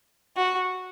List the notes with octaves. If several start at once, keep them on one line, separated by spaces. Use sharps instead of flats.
F#4